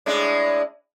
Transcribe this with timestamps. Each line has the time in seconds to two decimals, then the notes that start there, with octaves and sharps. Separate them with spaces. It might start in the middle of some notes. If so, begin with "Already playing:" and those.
0.06 A2 G#3 D4